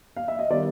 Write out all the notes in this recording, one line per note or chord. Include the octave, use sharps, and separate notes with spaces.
F5
E5
D#5
D#3 G3 B3 D5